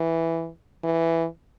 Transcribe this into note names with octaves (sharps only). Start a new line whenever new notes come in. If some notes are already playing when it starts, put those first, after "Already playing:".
Already playing: E3
E3